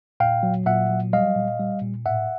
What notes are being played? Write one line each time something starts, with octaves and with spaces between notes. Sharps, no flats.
A#2 F5 G5
F#3
A#2 E5 F#5
F#3
G3 D#5 F5
A#2
G3
A#2
A2 E5 F#5